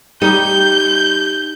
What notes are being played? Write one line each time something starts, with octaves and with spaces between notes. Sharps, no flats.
G3 D#4 G4 G6